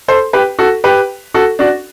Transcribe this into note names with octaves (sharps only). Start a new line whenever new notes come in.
A4 C5
G4 B4
F#4 A4
G4 B4
F#4 A4
D4 F#4